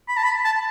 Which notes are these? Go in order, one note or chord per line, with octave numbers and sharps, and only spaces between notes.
B5
A5
B5
A5